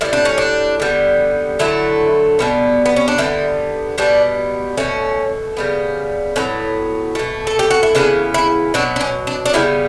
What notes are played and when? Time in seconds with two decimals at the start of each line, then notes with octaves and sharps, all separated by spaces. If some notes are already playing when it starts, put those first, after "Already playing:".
0.01 A2 G3 B3 E4
0.13 D4
0.25 C#4
0.38 D4
0.80 D3 G3 B3
1.59 D3 F#3 A3 E4
2.39 B2 G3 B3
2.86 B3
2.96 C#4
3.08 D4
3.18 D3 G3 B3 E4
3.98 B2 G3 B3 D4
4.77 B2 A3 C#4
5.57 C#3 G3 B3
6.36 A2 F#3 B3 C#4
7.15 B2 A3
7.47 A4
7.59 G4
7.71 F#4
7.83 E4
7.95 C#3 E3 B3 D4
8.34 E4
8.74 B2 F#3 B3 D4
8.96 D4
9.01 C#4
9.27 D4
9.46 D4
9.53 C#3 G3 B3 E4